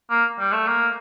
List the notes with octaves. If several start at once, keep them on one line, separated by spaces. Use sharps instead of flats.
A#3
G3
A3
A#3